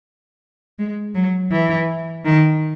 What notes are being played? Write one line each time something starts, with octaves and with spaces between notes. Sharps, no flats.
G#3
F#3
E3
D#3